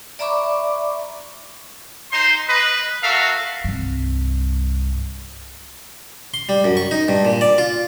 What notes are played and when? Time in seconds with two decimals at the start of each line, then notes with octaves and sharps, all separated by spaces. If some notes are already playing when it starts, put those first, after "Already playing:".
0.19 D5 E5 A#5 B5 C#6 D6
2.11 D#4 C5 C6
2.47 B4 D#5
3.02 F#4 A4 A#4 E5 F5
3.64 C2 G2
6.34 C6
6.49 G3
6.64 F#2
6.77 C#6
6.91 D#4
7.08 G2
7.25 A#2
7.41 D5
7.58 F4